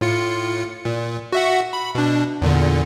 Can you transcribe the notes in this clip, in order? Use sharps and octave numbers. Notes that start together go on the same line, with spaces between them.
A2 F4 C#7
A#2
F#4 E5 F#5
B5
B2 D4
E2 A#2 D3